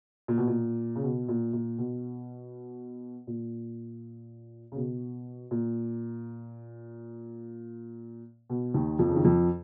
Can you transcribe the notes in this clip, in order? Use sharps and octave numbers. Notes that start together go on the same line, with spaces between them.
A#2
B2
A#2
C#3
B2
A#2
A#2
B2
A#2
C#3
B2
A#2
B2
D#2 D#3
F2 F3
C#3
D#3
F2 F3